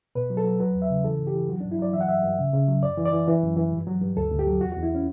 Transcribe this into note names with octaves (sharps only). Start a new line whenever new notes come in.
B2 B4
F#3
A4
F#3
F#3 B4
E2
E5
C#3
E3 A4
G2
G4
E3
F#3 F#4
D4
G2
E4
F#3 D5
E3 E5
F#5
G2 E5
G2
C#3
C#3
F#3
F#2 D5
E3
D5
E3
E3
F#2
E3
G2
F#3
G2
D2 A4
D2
G4
F#3
E2 F#4
F#4
E2
E4
C#4